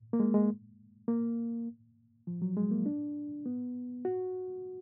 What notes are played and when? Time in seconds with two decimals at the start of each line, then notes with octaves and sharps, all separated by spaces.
0.13 A#3
0.20 G#3
0.34 G#3
1.08 A#3
2.27 F3
2.42 F#3
2.57 G#3
2.71 A#3
2.86 D4
3.46 B3
4.05 F#4